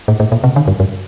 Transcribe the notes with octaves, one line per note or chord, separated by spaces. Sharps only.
A2
A2
A#2
C3
D3
G2
G2